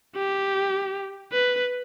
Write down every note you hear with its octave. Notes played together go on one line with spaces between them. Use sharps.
G4
B4